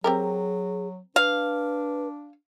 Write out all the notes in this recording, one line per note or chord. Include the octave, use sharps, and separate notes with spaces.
F#3 C4 G4 G#4 A#4
D4 B4 F5